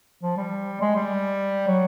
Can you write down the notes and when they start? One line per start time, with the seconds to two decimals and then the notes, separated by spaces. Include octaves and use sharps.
0.23 F3
0.37 G3
0.81 G#3
0.96 G3
1.67 F#3